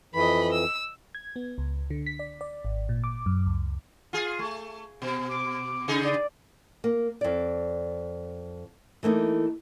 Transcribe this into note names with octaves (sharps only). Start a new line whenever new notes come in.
F2 E3 D#5 B5
E6
G#6
B3
C#2
D3
B6
D5
D5
G#1
A#2
D6
F#2
C#2
F4 G#4
A3
B2
D6
C#3 D#4 G#4
D5
A#3
F2 D5
E3 A3 A#3 D#4